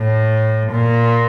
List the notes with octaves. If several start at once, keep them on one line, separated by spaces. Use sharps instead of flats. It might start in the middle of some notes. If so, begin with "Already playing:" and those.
Already playing: A2
A#2